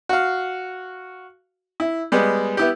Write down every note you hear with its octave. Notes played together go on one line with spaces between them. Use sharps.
F#4 F5
E4
G3 G#3 B3
B3 E4 G4